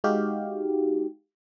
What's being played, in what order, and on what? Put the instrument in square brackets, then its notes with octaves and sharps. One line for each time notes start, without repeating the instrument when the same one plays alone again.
[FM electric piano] G#3 D#4 F#4 G4 F5